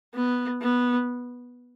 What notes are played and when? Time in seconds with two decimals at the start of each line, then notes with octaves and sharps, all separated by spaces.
0.14 B3
0.62 B3